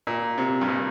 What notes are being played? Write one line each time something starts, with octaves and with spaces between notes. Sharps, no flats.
A#2
C3
G2
A#2